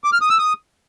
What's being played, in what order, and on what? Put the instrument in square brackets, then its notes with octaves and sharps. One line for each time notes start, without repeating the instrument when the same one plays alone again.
[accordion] D6
F6
D#6
E6
D#6